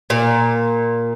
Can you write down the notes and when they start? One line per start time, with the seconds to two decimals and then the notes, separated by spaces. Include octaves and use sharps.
0.10 A#2